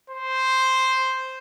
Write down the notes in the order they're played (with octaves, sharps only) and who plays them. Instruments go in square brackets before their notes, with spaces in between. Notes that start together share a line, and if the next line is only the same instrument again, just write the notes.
[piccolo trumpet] C5